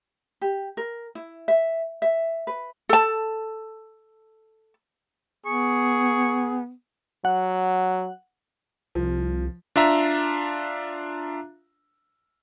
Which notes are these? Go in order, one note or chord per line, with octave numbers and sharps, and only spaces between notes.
G4
A#4
E4
E5
E5
B4
A4 A5
B3 G#4 C#6
F#3 F#5
C2 F3
D4 F4 E5 A#5